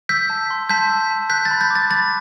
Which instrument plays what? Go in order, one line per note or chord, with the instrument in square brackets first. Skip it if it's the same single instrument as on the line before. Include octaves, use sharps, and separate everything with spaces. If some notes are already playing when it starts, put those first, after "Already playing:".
[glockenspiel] E6 G6 B6
A5
C6
A5 G6 B6
E6
A5
F#6 G6 B6
A6
B5
G6
D6
A6
B5 A6